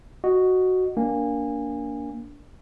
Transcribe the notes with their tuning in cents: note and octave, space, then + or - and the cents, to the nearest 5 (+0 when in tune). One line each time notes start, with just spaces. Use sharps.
F#4 +0 D#5 -10
A#3 +10 D4 -20 G#5 -25